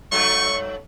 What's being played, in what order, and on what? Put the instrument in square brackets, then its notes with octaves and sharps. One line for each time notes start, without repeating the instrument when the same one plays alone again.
[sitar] G2 F#3 A3 [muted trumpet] C#6